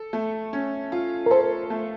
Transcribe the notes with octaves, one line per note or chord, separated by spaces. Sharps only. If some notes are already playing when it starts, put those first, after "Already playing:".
Already playing: A4
A3
C#4
F4
A#4
A4 C5
A3